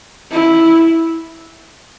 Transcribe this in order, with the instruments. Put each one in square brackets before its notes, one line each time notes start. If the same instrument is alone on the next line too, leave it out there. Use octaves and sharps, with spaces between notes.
[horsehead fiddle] E4